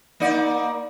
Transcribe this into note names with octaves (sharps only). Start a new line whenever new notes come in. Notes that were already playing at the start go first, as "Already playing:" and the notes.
A#3 D#4 D5